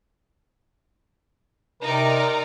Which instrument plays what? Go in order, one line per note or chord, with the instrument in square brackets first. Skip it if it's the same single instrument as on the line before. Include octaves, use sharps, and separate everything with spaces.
[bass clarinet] C3 [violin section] D#4 D5 A#5 [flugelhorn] A#4